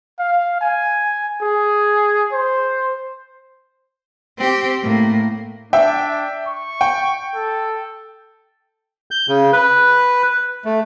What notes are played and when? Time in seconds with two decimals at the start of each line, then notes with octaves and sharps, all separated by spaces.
0.19 F5
0.61 G#5
1.42 G#4
2.33 C5
4.37 C4 G4
4.83 A2 A#3
5.73 D4 E5 G5
6.47 C#6
6.81 G5
7.35 A4
9.11 G6
9.29 C#3
9.53 B4
10.65 A3